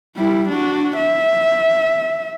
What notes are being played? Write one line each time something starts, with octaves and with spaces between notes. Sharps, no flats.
G3 E4
D4 F#4
E5